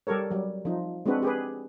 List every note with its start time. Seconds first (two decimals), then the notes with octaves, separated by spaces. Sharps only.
0.07 G3 G4 A4 A#4 C#5
0.31 F#3 G3
0.65 F3 D#4
1.06 G#3 C4 D4 F#4 B4
1.22 G4 G#4 B4